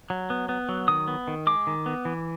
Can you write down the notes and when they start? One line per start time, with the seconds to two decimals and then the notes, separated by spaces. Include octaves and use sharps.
0.10 F#3
0.30 B3
0.49 B3
0.69 F#3
0.88 D#3 D#6
1.08 B3
1.28 D#3
1.47 G#3 D6
1.67 D#3
1.86 B3
2.05 E3